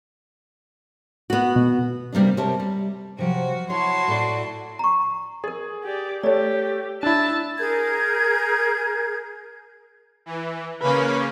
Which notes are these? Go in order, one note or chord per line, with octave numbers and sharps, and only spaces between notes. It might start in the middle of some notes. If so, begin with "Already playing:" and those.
B3 F#4
B2
C3 G3 A#3 B3 D4
C3 G4 A#4 C#5 A5
G3
C3 F3 F#3 F#4
E4 F#4 C#5 A5 C6
A2 D5
A#5 C#6
G#4 A#4 D#5
G4 D5
A3 G4 A4 C#5 D5
D4 E4 A5 E6
G#4 A#4 G6 G#6
E3
C#3 A#3 C#4 B4